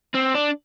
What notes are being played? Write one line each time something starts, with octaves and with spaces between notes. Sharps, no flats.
C4
D4